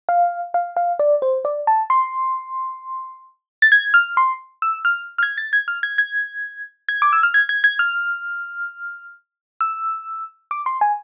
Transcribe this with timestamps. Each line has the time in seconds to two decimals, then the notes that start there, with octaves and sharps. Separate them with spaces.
0.09 F5
0.54 F5
0.77 F5
0.99 D5
1.22 C5
1.45 D5
1.67 A5
1.90 C6
3.62 A6
3.72 G#6
3.94 F6
4.17 C6
4.62 E6
4.85 F6
5.18 F6
5.23 G#6
5.38 A6
5.53 G#6
5.68 F6
5.83 G#6
5.98 G#6
6.89 G#6
7.02 D6
7.13 E6
7.23 F6
7.34 G#6
7.49 G#6
7.64 G#6
7.79 F6
9.61 E6
10.51 D6
10.66 C6
10.81 G#5